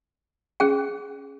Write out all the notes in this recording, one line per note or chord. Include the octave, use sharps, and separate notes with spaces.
C#4 G#4 G5